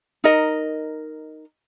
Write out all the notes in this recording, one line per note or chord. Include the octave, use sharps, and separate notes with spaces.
D#4 A#4 D#5